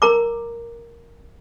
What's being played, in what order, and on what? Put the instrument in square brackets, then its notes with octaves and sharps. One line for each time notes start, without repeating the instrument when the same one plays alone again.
[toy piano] A#4 A#5 D6